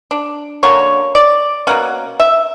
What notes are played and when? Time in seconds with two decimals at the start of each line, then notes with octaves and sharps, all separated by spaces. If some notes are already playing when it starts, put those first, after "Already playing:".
0.11 D4
0.63 D3 F#3 A#3 C#4 C#5
1.15 D5
1.67 B2 A#3 C#4 F#5
2.20 E5